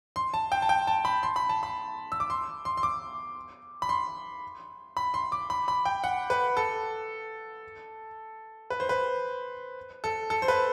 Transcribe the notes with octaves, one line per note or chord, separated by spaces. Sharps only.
C6
A5
G5
A5
G5
A5
B5
C6
B5
A5
B5
E6
D6
C6
C6
C6
D6
B5
C6
B5
C6
D6
B5
B5
G5
F#5
B4
A4
B4
C5
B4
A4
A4
C5
B4